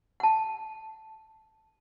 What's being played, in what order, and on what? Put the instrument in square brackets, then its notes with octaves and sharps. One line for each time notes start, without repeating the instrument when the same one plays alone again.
[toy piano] F#5 A5